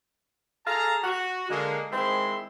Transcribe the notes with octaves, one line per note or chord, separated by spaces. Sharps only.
G#4 A4 F5 A5 A#5
F#4
D3 G#3 A#3
D#3 G#3 C4 E4 C5 C6